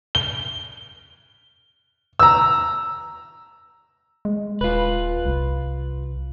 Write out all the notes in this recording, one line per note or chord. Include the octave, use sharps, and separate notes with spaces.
G7
A#5 E6
G#3
D#1 F4 B4
C2